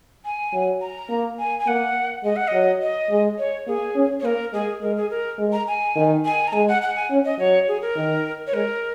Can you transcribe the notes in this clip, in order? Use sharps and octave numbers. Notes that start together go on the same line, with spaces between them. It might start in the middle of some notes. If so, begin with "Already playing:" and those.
G#5
F#3
A#5
A#3
G#5
G#5
A#3 F#5
G#3 D#5
F#5
F#3 D#5
D#5
G#3
C#5
A#3 G#4
C#4
C#5
A#3 A#4
G#3 G#4
G#3 A#4
G#4
A#4
G#3
A#5
G#5
D#3
G#5
A#5
G#3 G#5
F#5
F#5
G#5
C#4
D#5
F#3 C#5
G#4
A#4
D#3
C#5
G#3 A#4